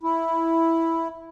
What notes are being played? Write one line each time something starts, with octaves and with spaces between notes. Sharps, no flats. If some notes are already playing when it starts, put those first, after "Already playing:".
E4